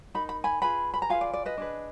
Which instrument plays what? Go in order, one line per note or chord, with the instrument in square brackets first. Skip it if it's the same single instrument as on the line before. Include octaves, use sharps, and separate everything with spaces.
[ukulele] D#4 A#4 B5
B5
G#5 B5
F4 G#4 B4 G#5 B5
B5
A#5
F4 G#4 B4 F5 G#5
D5
D5
B4 D#5
D4 G#4 B4